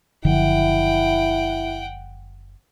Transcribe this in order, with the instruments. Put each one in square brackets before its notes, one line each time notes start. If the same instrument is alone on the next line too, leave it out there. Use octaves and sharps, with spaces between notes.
[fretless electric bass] F#1 D3 F3 [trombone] E4 [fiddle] F#5 G5